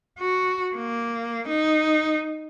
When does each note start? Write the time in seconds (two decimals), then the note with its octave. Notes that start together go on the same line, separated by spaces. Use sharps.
0.19 F#4
0.76 A#3
1.48 D#4